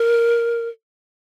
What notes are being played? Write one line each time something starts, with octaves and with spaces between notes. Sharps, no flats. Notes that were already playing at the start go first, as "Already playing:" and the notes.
Already playing: A#4